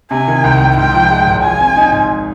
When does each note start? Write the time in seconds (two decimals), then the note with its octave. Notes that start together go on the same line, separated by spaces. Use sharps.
0.11 C3 G#5
0.28 D#3
0.44 C2 G5
0.60 C2
0.77 G#2 G5
0.93 F3
1.10 G#3
1.27 G#1
1.42 F3 G#5
1.59 C4
1.77 D#4
1.92 G#2